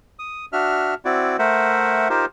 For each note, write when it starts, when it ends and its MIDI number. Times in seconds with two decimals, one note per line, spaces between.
0.19 0.46 87
0.53 0.94 62
0.53 0.94 66
0.53 0.94 76
0.53 0.94 89
1.05 1.37 60
1.05 1.37 64
1.05 1.37 66
1.05 1.37 74
1.39 2.09 57
1.39 2.09 70
1.39 2.09 72
1.39 2.09 76
1.39 2.09 78
2.10 2.26 63
2.10 2.26 65
2.10 2.26 67
2.10 2.26 70
2.10 2.26 72